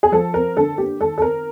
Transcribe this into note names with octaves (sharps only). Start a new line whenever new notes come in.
G#4
F3 A4
C4 A#4
D3 A4
A#3 G4
D#3 A4
A4
C4 A#4